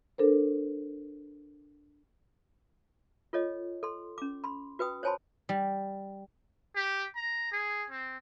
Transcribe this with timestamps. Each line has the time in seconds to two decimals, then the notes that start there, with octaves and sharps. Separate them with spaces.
0.18 D4 A4 A#4 C5
3.33 F4 A4 C#5 D#5
3.83 A4 C6
4.18 C#4 D6
4.44 B5 C6
4.79 F#4 B4 G5 D#6
5.03 C5 C#5 G#5 A5 B5 C6
5.49 G3
6.76 G4
7.16 A#5
7.52 G#4
7.90 C4